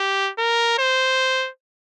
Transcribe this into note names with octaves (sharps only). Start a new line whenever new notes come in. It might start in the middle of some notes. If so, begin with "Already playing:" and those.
Already playing: G4
A#4
C5